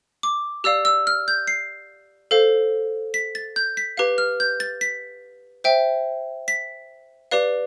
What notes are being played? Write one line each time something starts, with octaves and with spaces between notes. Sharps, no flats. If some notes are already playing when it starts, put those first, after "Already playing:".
D6
G4 D5 F5 E6
E6
F6
G6
C7
A4 C5 F5
B6
A6
G6
B6
G4 B4 F5
F6
G6
A6
B6
C5 E5 G5
B6
G4 B4 D5 F5